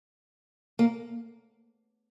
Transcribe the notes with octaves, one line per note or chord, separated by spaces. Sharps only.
A#3